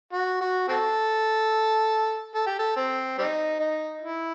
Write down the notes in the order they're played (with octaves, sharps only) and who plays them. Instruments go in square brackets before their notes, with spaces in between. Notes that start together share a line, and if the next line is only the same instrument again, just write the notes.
[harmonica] F#4
F#4
C4 F#4 A4
A4
G4
A4
C4
G3 C4 D#4
D#4
E4